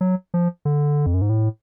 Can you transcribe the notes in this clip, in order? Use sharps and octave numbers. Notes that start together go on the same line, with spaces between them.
F#3
F3
D3
F2
F#2
G#2
A2